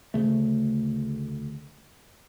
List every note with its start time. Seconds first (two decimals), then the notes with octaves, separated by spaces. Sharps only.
0.14 D2 C#3 A3